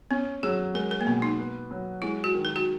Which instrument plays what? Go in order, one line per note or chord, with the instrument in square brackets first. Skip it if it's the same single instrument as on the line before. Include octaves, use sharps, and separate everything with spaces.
[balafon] B3 [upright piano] C#4
[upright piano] F#3 [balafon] G#4
[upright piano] G#3 [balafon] A#4
[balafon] A#4
A#3
[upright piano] B2 [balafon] B3
[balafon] D#4
[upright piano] B3
F#3
[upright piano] G#3 [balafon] E4
[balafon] F#4
[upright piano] D#3
[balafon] A#4
F#4